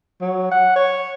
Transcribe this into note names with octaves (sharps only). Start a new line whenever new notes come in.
F#3
F#5
C#5